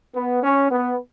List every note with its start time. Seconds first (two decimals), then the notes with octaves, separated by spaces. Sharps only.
0.14 B3
0.42 C#4
0.70 B3